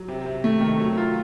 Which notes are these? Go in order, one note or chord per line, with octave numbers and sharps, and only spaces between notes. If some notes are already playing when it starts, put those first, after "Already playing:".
Already playing: F#3
C3
C3
A3
D#3
F#3
F4